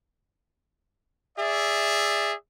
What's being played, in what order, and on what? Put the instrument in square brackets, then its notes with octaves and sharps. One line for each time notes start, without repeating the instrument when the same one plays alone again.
[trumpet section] G#4 D5 E5